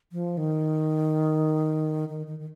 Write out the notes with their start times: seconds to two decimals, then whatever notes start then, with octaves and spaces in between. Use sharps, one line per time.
0.12 F3
0.37 D#3
2.09 D#3
2.27 D#3
2.39 D#3